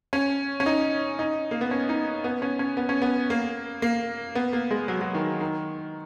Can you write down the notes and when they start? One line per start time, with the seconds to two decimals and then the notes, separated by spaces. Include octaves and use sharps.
0.13 C#4
0.60 C#4
0.66 D#4
1.19 D#4
1.51 A#3
1.61 B3
1.71 C#4
1.89 D#4
2.24 B3
2.42 C#4
2.59 C#4
2.77 B3
2.89 C#4
3.02 B3
3.30 A#3
3.82 A#3
4.35 B3
4.53 A#3
4.71 G#3
4.88 F#3
5.01 F#3
5.14 D#3
5.41 D#3